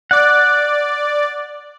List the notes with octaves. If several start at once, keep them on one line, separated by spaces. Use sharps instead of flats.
D5 F#5 D6